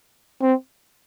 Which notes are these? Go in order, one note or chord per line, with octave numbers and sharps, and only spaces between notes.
C4